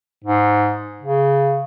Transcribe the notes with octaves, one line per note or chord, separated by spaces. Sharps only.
G#2
C#3